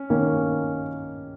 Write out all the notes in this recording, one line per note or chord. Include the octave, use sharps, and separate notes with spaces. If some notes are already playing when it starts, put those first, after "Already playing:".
Already playing: C#4
D#3 A#3 C#4